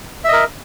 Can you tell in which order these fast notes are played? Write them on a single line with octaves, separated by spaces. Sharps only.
E5 D#5 A#4